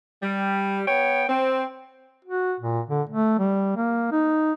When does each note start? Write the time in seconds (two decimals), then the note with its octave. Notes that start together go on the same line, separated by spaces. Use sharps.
0.22 G3
0.86 B3 C#5 G5
1.29 C4
2.25 F#4
2.60 A#2
2.90 D3
3.10 A3
3.39 G3
3.76 A#3
4.12 D#4